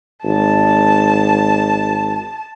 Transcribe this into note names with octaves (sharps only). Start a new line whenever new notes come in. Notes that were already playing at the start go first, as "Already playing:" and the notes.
G#1 A5